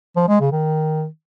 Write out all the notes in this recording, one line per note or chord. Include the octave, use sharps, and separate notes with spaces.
F3
G#3
C#3
D#3